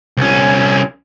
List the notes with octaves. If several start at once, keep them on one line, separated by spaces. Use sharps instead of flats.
C2 C#4